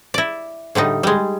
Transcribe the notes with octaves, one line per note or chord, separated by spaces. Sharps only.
E4 D5
A2 D3 G3 D#4
G3 G#3